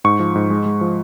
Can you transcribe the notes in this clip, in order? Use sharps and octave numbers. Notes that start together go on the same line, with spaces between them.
G#2 C#6
F3
G#2
G#3
G#3
F3